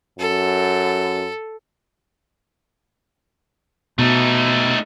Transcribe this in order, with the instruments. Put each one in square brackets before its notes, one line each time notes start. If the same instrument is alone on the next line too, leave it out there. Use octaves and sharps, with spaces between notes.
[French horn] F#2 [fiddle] A4
[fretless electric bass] B2 [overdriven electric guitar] A3 D#4